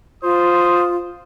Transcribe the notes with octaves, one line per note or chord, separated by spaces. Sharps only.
F4 C5 D#6